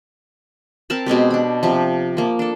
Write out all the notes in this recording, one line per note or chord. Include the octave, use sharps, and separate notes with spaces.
C4 A#4 A5 B5
B2 G#3 C4 G4
D4 B5
C3 F3
F3 A#3
D4 A4